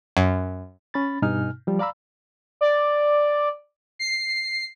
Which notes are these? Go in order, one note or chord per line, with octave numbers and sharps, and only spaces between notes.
F#2
C#4 B5 A6
G2 B2 D#4 G#5 F6
F3 G3
D5 F5 A#5 B5 E6
D5
C7